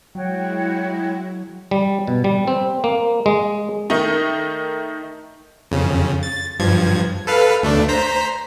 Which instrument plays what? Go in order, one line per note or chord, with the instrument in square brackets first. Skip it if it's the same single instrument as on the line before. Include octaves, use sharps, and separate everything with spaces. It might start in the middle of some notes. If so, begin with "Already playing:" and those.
[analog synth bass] F#3 [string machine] G#3 E4 [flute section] F#4 C#5 G5
[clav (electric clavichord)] G3
B2
G3
C4
A#3
G#3
[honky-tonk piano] D#3 A3 D#4
[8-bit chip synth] F2 C#3
A6
G2 F3 G#6
A4 B4 F5
D2 A3 D4
C5 A#5 B6